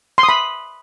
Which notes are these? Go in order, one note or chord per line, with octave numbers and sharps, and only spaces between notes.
C6
D#6
B5